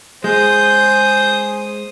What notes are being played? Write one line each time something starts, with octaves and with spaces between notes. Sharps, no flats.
G#3 G#4 C5 D#6 G6